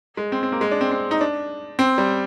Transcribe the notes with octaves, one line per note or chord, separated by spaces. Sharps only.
G#3
C4
C4
A#3
G#3
D4
C4
C4
D#4
D4
C4
G3